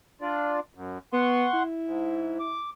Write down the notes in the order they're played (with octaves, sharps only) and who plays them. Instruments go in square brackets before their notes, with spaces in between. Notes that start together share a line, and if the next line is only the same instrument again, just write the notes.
[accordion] D4 F4 D5
F#2
[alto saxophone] B3 [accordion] F#5 C6 C#6
[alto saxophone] E4
[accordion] G#2
D6